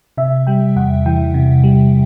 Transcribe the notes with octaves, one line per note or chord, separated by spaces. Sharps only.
C3 E5
G3 G5
E2 F#5
E3 G5
C3
G3